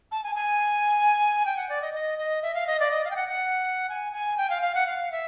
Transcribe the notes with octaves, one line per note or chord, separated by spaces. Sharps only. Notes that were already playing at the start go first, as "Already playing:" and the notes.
A5
G#5
G#5
G5
F#5
D5
D#5
D#5
D#5
E5
F5
D#5
D5
D#5
F5
G5
F#5
F#5
G#5
G#5
G5
F5
F5
F#5
F5
E5